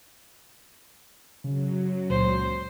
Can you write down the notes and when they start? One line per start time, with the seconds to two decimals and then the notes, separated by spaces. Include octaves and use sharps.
1.44 F#2 C#3 F#3
2.10 C#2 A#2 C5